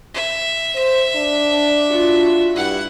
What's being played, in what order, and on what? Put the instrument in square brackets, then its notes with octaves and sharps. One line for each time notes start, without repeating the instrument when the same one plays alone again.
[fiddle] E5
[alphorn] C5
D4
[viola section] F4 F#4
[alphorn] G2 [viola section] E4 [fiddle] F#5